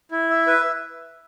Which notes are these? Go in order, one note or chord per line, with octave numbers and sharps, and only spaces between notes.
E4
E5
B4